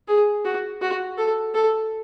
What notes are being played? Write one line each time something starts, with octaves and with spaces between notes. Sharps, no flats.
G#4
F#4
F#4
A4
A4